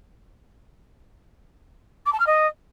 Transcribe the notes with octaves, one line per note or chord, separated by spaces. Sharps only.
D6
A5
F6
D#5